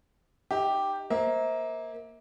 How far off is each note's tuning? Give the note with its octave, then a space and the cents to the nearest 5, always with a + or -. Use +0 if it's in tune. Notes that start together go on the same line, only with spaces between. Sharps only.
D#4 -20 G4 +0 D#5 +45
A#3 +5 C5 +0 E5 -40